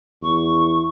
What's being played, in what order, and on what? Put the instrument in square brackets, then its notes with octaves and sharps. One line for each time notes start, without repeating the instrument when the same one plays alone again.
[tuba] E2 [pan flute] C#6